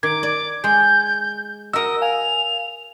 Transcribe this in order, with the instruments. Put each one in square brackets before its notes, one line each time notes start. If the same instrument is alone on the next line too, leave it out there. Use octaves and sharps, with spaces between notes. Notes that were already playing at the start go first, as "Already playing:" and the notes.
[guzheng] D#3 [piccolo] D6 [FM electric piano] G#6
[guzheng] D5
[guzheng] G#3 [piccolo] G6
[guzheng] F#4 A#4 [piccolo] D#5 [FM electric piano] E6
[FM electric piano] F5 G#5 [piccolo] F7